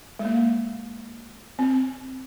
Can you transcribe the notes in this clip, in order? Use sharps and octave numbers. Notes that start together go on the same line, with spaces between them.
G#3
A#3
C4